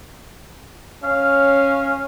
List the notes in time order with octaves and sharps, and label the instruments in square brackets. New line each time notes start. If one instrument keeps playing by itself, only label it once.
[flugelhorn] C#4 [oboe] F5